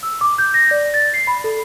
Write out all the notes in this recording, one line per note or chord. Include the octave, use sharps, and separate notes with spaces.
E6
D6
G6
A#6
D5
A6
C7
B5
A4